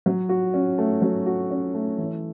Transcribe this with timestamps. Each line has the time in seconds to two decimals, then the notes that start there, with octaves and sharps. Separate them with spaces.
0.06 F#3
0.29 F#4
0.54 C#4
0.78 A3
1.02 F#3
1.26 F#4
1.51 C#4
1.74 A3
1.98 E3